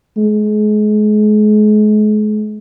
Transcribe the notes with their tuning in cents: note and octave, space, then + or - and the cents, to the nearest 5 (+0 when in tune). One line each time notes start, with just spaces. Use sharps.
G#3 +35